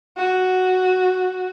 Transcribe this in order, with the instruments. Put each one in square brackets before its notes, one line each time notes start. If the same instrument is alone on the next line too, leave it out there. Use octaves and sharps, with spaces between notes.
[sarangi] F#4